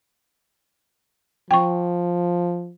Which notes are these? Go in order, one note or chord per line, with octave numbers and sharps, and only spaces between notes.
F3 G5 C#6